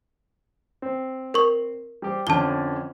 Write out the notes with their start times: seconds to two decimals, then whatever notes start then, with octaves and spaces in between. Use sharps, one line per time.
0.82 C4
1.34 A#4 C#6
2.02 G3 G4 C5
2.27 F2 D3 C#4 A5 G7